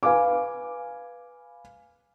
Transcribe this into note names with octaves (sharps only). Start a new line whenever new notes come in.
B4 F5 G#5 D6